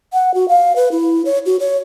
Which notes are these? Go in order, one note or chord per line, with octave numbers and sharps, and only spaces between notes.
F#5
F#4
F5
B4
E4
C#5
F#4
C#5